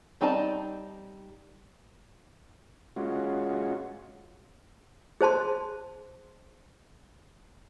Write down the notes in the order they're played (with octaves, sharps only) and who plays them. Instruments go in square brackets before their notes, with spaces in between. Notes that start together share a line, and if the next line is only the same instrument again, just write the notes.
[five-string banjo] G3 C4 D#4 D5 A5
[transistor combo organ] G#3 C#4 F4 F#4
[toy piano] G#4 C5 A5 C6